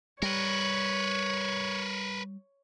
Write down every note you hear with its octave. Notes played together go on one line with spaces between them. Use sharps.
G3 A#4 B4 C#5